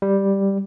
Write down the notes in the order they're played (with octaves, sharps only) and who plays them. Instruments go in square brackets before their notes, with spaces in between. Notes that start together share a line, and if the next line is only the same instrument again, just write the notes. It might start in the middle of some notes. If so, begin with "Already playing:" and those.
[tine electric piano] G3